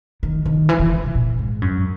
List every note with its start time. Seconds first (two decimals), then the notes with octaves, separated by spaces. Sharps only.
0.23 D#3
0.46 D#3
0.69 E3
0.80 E3
0.93 E3
1.04 A#2
1.15 A#2
1.39 G#2
1.62 F#2